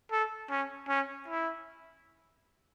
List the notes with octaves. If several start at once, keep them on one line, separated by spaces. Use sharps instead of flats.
A4
C#4
C#4
E4